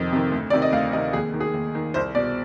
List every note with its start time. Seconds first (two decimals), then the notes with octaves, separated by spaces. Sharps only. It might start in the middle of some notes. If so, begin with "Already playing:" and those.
Already playing: F2 C3 D#3 D#5
0.12 C3 D#3
0.32 D2
0.50 C3 D#3 D5
0.62 D#5
0.72 D2 F5
0.93 C3 D#5
0.97 D#3
1.13 D#2 G#4
1.34 D#3
1.40 G#4
1.54 D#2
1.75 D#3
1.94 C2 C5
2.15 B2 D5